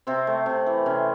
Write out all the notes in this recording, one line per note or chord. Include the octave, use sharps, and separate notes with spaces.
C3 C4
A3
C3
E3
C3 C#4